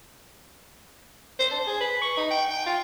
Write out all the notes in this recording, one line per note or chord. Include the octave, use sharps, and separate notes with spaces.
C5
D4
G#4
B4
C#6
D#4
G5
G5
F4